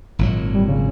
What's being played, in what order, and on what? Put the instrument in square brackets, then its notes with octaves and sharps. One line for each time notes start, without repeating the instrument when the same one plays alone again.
[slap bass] G#1 A#2 F#3
[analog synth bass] G3
C#3